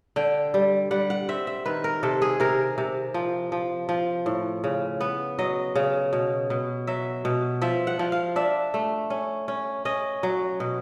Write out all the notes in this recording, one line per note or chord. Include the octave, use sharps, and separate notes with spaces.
D3 G5
G3
G3 F#5
F#5
C4 E5
E5
D#3 B4
A#4
C3 A4
G#4
C3 A#4
C3
F3
F3
F3
A2
C#3
B3
F#3 D#5
C#3
B2
B2
F#3 E5
B2
F3 E5
F#5
F3
F5
D4 E5
A3
C#4
C#4
C#4 D#5
F#3
B2